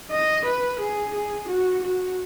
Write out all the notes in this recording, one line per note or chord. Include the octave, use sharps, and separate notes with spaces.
D#5
B4
G#4
G#4
F#4
F#4